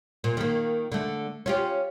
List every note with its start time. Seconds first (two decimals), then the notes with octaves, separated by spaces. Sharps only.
0.24 A#2
0.37 D#3 A#3
0.92 D3 A3
1.46 C#4 F4 G4